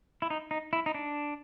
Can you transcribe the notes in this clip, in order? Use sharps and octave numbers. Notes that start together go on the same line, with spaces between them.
E4
D#4
D#4
E4
D#4
D4